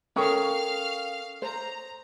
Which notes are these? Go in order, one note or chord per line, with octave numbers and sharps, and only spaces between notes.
C#4 A4 A#4 F5 G5 C#6 D#6 F6
C5 A#5